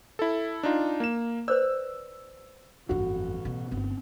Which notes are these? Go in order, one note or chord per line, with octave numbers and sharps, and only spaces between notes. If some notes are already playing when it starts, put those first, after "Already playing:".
E4 A4
D4 D#4 F4
A#3 E7
B4 C5 D5 E6
G1 F2 A2 E3 F#4
B2
G1 B3 C4